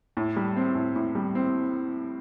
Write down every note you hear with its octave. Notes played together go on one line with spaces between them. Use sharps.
A2
G3
C4
A2
A2
G3
C4